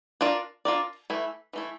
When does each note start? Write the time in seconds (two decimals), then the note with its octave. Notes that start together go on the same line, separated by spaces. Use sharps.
0.21 D4 F4 A#4 D5
0.65 D4 F4 A#4 D5
1.10 E3 A3 E4
1.53 E3 A3 E4